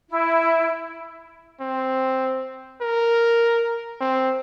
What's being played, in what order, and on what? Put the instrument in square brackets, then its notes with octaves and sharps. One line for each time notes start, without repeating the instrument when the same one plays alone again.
[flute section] E4
[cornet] C4
A#4
C4